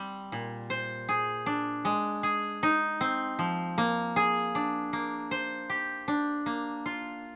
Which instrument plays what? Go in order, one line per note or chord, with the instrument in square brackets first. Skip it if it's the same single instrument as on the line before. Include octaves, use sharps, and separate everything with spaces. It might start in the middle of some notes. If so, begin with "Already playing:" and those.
Already playing: [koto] G3 C4
A#2
C5
G#4
D4
G#3
G#4
D#4
C4
F3
A#3
G#4
D4
A#3
C5
G4
D4
A#3
F4